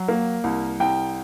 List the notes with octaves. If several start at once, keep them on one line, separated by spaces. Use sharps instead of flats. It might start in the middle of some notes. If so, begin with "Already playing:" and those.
Already playing: F#3
A#3
C2
C2 G5